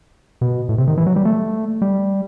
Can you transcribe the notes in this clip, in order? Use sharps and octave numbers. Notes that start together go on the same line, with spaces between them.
B2
A2
C3
D#3
E3
F#3
G3
A3
G3